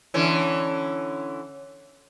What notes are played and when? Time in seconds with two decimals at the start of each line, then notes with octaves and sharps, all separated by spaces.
0.14 D3 E3 C#4